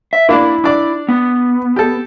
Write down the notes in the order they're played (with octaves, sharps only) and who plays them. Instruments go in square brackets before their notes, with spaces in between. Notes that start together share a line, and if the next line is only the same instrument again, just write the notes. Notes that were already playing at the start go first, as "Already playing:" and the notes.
[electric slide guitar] E5
[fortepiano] A#3 D4 D5 [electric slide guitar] E4
[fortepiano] D4 D5 D6
[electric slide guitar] B3
[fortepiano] G4 A4